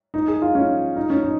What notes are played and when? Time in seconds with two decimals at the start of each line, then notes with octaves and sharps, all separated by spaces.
0.14 D#4
0.28 G#4
0.42 F4
0.55 C#4
0.96 D#4
1.10 C#4
1.22 D#4